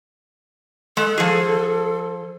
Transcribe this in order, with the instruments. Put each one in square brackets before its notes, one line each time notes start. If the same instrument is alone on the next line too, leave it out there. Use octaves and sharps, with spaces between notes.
[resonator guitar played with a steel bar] G#3 [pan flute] A4
[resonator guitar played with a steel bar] F3 G#4